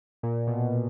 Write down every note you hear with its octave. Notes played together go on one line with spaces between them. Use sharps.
A#2
B2